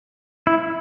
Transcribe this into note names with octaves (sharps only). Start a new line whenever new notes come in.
E4